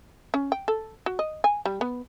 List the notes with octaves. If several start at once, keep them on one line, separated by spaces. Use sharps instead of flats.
C#4
G5
A4
F#4
D#5
G#5
G3
B3